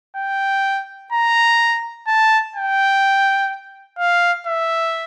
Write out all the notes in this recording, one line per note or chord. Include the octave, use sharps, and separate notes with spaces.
G5
A#5
A5
G5
F5
E5